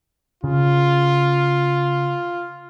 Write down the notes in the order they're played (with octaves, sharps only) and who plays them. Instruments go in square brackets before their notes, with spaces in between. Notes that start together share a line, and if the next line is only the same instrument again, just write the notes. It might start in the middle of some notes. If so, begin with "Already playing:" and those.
[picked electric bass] C#3 [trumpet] F4